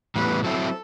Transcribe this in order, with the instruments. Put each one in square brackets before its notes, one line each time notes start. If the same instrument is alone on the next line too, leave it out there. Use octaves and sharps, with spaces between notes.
[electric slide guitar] A2 E3 G3 B3 [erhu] B4
[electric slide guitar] F#3 C4 E4 [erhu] A4